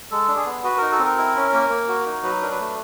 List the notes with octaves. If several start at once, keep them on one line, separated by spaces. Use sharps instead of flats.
G#3 A4
D4
G#4
B3
F#4 B4
D#4 A#4
A4
C4
A#4
E4
C#4
A#3
A#3
F#4
D#4
F#3 B4
D4 A#4
B4
A3